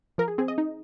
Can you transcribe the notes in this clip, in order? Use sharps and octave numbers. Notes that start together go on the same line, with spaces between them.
F3 A#4
G#4
C4 G#4
D#5
D#4